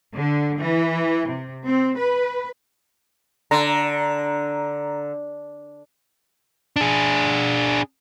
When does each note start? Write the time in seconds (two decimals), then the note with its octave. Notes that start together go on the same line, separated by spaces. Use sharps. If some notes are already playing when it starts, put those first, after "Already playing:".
0.14 D3
0.58 E3
1.28 C3
1.65 C4
1.98 B4
3.51 D3 A#5
6.76 D4 G#4